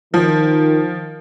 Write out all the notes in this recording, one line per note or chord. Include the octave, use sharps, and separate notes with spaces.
D#3 F3